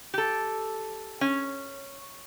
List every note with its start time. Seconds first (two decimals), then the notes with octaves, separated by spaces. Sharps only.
0.14 G4 A4
1.21 C#4